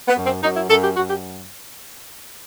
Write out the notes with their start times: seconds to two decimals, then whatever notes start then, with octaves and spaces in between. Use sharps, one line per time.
0.08 B3
0.17 F#2
0.26 C4
0.43 F#2 D#4
0.56 E4
0.69 F#2 A4
0.83 G4
0.96 F#2 F#4
1.10 G4